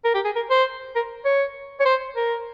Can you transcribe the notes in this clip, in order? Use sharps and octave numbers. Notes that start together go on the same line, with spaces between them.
A#4
G4
G#4
A#4
C5
A#4
C#5
C#5
C5
A#4